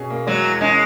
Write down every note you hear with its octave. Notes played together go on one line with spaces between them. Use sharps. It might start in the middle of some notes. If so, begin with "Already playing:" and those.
Already playing: B2 C#4 G#4
A#3
F#3 G#3
E2
G#3 C#4